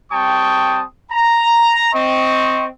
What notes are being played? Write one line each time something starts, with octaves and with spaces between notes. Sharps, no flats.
G3 C4 G5 A5 C#6 D#6
A#5
C4 D#5 C#6